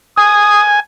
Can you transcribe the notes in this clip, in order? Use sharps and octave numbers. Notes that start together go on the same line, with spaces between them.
G#5 D#6